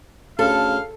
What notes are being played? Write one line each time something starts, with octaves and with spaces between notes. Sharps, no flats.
D2 C#3 A4 F5